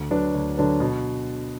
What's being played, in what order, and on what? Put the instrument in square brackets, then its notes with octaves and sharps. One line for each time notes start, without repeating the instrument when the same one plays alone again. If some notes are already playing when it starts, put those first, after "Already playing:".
Already playing: [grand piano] D2
D3 F#3 D4 B4
D2
D3 F#3 D4 B4
B2